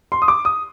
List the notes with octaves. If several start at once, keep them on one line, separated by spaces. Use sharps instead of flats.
C6
D#6
D6
D#6